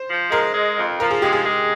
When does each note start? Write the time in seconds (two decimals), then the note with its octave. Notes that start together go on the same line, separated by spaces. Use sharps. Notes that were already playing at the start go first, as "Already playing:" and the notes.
Already playing: C5
0.09 F3
0.31 G#3 A#4
0.54 G#3
0.77 F2
1.00 F3 A#4
1.11 G#4
1.22 G#3 G4
1.33 G#4
1.46 G#3